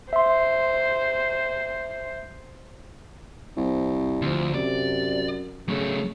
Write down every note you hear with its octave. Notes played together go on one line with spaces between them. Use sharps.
C5 E5 C6
C2 C4
D2 F3
F#2 C3 D5
C#3 F#3 A3